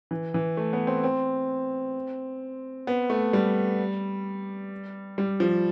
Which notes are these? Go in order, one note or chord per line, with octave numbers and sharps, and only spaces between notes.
E3
E3
A3
B3
C4
C4
B3
A3
G3
G3
F3